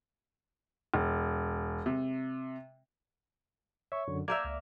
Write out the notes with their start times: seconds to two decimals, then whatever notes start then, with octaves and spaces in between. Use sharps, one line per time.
0.94 E1
1.86 C3
3.92 C#5 E5 C#6
4.08 F#2 D3
4.28 A#3 A#4 D5 E5 E6 G6 G#6
4.44 C#2